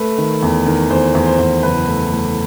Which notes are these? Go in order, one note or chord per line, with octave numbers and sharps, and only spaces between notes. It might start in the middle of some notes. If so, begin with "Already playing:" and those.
Already playing: A3 B4
D#3
E2
D#3
E2 C5
E2
C5
E2
F#1 B4
A3
A3